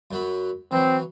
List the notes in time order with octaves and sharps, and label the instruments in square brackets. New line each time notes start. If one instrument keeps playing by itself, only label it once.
[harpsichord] F#2 F#3 B5
[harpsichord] E3 F#3 [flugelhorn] C4